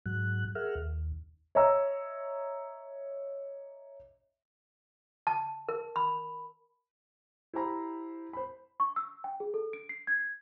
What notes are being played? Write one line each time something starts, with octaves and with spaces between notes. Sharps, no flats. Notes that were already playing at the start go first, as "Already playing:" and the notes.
G#2 F#3 F#6
G#4 A#4 E5 F#5 F6
D#2
C#5 D#5 E5 A#5 E6
A5
A#4
B5
E4 G4 C5 A#5 B5
C5 B5
C#6
E6
G5
G#4
A4
D7
C7
G#6